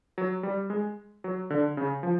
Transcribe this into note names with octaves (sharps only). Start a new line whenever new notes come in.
F#3
G3
G#3
F#3
D3
C#3
F3